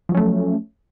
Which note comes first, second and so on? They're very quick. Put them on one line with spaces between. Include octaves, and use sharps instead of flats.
F3 F#3 C#4 A3